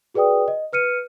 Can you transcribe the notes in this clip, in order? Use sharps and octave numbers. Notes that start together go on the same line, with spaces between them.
F#4 G#4 B4 D5 G5 D#6
D#5
B4 F6 C#7 D#7